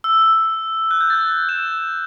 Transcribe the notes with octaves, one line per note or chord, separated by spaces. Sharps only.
E6
F#6
G6
A6
E6 E7